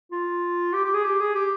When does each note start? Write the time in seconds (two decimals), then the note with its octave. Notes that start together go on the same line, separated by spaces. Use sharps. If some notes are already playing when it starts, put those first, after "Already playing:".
0.12 F4
0.73 G4
0.84 G4
0.94 G#4
1.04 G4
1.20 G#4
1.35 G4